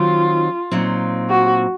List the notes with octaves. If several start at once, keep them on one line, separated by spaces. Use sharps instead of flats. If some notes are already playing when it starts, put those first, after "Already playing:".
Already playing: D#3 F#3 C4 D#4 F4
A#2 F#3 C4 D#4
F#4